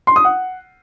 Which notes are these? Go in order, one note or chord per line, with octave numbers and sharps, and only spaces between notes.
C6
D#6
F#5